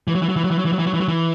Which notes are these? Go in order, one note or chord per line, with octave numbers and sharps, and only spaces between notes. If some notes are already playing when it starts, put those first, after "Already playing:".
E3
F#3
E3
F#3
E3
F#3
E3
F#3
E3
F#3
E3
F#3
E3
F#3
E3